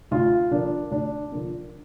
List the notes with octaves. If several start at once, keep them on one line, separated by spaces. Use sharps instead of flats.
D2 F4
D3 F3 A#3 D4
D2 D4
D3 F3 A#3